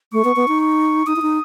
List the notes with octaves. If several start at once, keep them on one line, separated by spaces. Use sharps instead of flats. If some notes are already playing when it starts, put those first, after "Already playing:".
A3 C#6
B3
B3
D#4
C#6
D#4 D#6
E4
D#4